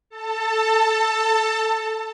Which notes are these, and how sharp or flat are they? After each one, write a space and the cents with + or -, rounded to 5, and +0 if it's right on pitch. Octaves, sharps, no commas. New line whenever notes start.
A4 +0 A5 +30